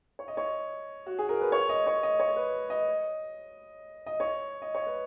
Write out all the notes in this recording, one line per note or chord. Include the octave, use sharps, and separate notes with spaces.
C#5
D#5
C#5
F#4
G#4
A#4
B4
C#5
D#5
C#5
D#5
C#5
B4
D#5
D#5
C#5
D#5
C#5
B4